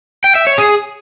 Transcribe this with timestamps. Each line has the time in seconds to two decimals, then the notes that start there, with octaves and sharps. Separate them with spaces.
0.24 G5
0.35 E5
0.47 C#5
0.58 G#4